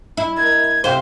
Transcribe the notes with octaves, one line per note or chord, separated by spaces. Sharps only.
E4
G#3 A#4 G#6
C3 C5 F5